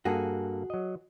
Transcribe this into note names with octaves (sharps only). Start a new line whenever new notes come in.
G2 A#3 F#4 G#4 A4
F#3 D#5